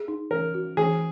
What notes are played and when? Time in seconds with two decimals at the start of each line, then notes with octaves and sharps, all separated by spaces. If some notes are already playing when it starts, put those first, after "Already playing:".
Already playing: G#4
0.08 D#4
0.31 E3 A#4
0.54 F#4
0.77 E3 G#4